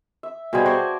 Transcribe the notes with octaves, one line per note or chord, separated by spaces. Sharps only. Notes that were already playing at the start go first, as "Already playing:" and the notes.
E5
B2 G3 G#4 C5 G#5
F#4 C5 D5 G#5 A5